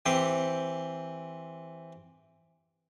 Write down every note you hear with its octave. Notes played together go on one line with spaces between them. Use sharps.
E3 C4 G4 C5